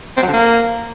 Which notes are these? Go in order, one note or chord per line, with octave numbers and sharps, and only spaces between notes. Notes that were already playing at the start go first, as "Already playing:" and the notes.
C4
F#3
D3
A#3